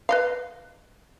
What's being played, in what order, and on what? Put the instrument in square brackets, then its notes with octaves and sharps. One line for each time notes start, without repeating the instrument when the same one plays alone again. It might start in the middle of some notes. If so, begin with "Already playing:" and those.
[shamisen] B4 D#5 F5